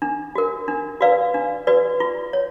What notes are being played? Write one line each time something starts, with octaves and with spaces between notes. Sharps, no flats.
D4
F#4 A#4
D4
F#4 B4 D5 F5
D4
F#4 B4 D5
F4
C#5